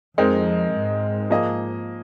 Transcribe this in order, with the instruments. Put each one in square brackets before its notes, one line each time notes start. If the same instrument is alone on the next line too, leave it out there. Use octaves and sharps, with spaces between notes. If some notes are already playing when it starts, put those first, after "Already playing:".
[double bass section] F2 [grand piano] G#3 C4 D#4 A#4
[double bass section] G#2
[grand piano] F3 A#3 G#4 D#5